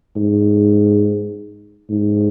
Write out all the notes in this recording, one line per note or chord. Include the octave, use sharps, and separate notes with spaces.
G#2
G#2